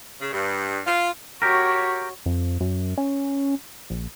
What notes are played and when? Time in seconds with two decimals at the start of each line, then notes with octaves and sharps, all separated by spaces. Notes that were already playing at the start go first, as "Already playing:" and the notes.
0.20 C#3
0.32 G2
0.86 F4
1.42 F#4 G4 A#4 C#5
2.26 F2
2.61 F#2
2.98 C#4
3.90 A#1